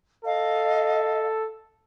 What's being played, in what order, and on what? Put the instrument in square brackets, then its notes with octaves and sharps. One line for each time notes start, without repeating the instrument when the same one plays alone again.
[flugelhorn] A4 [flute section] D#5 F5